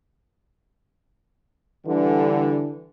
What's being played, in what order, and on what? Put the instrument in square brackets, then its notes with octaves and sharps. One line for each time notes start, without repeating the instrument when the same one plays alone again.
[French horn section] D3 E3 G3